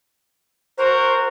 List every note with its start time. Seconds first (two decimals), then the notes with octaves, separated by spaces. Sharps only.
0.78 F#4 A#4 C5